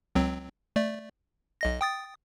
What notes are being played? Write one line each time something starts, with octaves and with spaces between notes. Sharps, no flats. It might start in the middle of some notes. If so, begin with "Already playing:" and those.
C#2 F#3 C4
A3 D5
B1 D#5 A#6
G5 D#6 A6